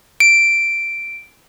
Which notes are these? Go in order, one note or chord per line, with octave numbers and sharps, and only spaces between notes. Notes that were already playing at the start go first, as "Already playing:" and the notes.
D7